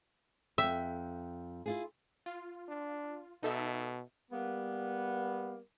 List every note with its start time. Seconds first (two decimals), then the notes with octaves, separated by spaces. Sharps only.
0.58 F2 E5 G5
1.66 E4 F4 G#4
2.26 F4
2.69 D4
3.43 B2 D#4 A4 E5
4.31 G3 A#3 B3